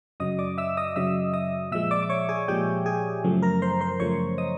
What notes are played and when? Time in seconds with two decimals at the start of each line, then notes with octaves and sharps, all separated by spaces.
0.20 F#2 C#3 F#3 D#5 D#6
0.39 D5 D6
0.58 E5 E6
0.77 D#5 D#6
0.96 F#2 C#3 F#3 E5 E6
1.33 D#5 D#6
1.71 A#2 F3 G#3 E5 E6
1.91 D5 D6
2.03 D6
2.09 C#5 C#6
2.29 G#4 G#5
2.48 A#2 F3 G#3 G4 G5
2.86 G#4 G#5
3.24 F#2 C#3 F3 A3
3.42 A#4 A#5
3.62 C5 C6
3.81 C5 C6
4.00 F#2 C#3 F3 A3 C#5 C#6
4.38 D#5 D#6